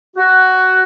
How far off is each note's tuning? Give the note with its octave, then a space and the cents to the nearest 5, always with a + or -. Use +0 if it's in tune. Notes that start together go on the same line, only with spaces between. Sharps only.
F#4 +10